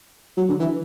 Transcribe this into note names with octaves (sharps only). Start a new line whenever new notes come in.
F#3
D3
E3